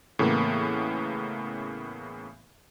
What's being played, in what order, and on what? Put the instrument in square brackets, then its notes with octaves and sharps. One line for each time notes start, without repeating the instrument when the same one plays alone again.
[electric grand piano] A2 C#3 E3 A#3 B3